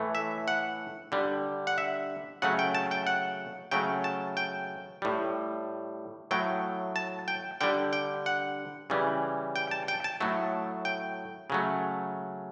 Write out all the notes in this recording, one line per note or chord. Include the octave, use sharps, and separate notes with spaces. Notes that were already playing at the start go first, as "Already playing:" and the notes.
Already playing: A2 E3 A3
E5
F#5
D3 G3
F#5
E5
C#3 F#3 A3 F#5
G5
A5
G5
F#5
C#3 F#3 A3 G5
A5
G5
A2 G3
A2 F#3 A3 G5
A5
G5
D3 G3 G5
G5
F#5
C#3 E3 G3
G5
A5
G5
A5
A2 F#3 A3
G5
C#3 F#3 A3